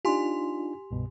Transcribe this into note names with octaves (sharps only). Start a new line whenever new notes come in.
D4 D#4 F4 G4 G#5 C6
C2 G2 B2